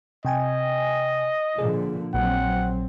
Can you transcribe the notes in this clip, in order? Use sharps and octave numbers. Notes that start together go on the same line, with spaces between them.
C3 D#5 G5 G#5
A#2 D3 F3 G#4
A#1 A#2 F#3 C4 F#5